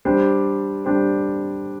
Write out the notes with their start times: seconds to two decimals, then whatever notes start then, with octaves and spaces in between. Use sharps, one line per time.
0.05 G3 D4 G4 C5
0.85 G3 D4 G4 C5